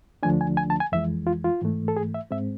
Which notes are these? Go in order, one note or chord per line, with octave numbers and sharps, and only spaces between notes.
D2 D3 F3 A3 D4 G#5
G#5
G#5
A5
G#5
F2 E3 G#3 E5
F4
F4
G#2 E3 A3
A4
G#4
E5
G#2 G#3 C4 E5